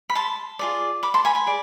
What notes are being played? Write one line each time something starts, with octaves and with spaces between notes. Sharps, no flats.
B5
A5 C6
F4 G#4 D5
B5 D6
A5 C6
G#5 B5
G#5 B5
G#4 D5